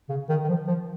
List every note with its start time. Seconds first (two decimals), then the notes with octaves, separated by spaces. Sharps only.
0.09 C#3
0.29 D#3
0.44 D#3
0.48 F3
0.68 F3